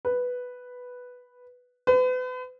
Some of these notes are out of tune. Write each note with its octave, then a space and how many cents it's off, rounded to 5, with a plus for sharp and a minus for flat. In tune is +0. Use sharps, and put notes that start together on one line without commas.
B4 +0
B4 +40